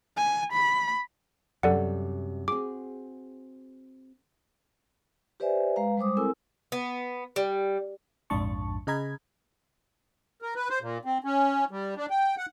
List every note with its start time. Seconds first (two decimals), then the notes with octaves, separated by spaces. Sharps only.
0.17 G#5
0.52 B5
1.63 F#2 C3 G3 A4 D5 F#5
2.48 C4 F#4 G#4 D6
5.40 G4 B4 C5 D5 E5 G#5
5.76 G#3 B4 F5 A#5
5.97 G3 G#3 C5 D6 D#6
6.17 C4 E4 A4 A#4 G#5 E6
6.72 B3
7.36 G3
8.30 A#1 F2 G#2 D4 A5 C#6
8.87 C#3 G#4 D#5 A#5 B5 G#6
10.42 A#4
10.55 B4
10.70 C5
10.81 A#2
11.05 C4
11.24 C#4
11.71 G3
11.96 D4
12.10 G5
12.37 F#5